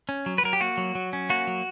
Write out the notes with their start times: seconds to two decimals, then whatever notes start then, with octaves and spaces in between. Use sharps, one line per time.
0.09 C#4
0.26 F#3
0.38 B4
0.43 F#3 A#4
0.53 G4
0.60 A#3 F#4
0.77 F#3
0.95 F#3
1.13 C#4
1.29 A#3 F#4
1.47 F#3